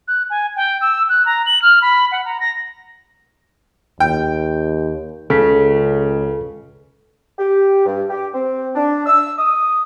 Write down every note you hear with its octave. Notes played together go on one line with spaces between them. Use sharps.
F#6
G#5
G5
E6
F#6
A#5
F#7
F6
B5
F#5
A#5
A#6
D#2 G5
C#2 C#3 A4 B6
G4
G2
G4
C4
D4
E6
D#6